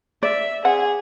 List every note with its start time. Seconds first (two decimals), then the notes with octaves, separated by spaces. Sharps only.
0.23 D5 E5
0.65 C4 G#4 F#5